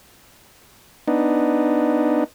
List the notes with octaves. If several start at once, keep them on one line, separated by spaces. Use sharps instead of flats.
B3 D4 D#4